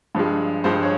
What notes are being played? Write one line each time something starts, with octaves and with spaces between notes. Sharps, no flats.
G2 F3 G#3
G2 F3 G#3 C5
C#5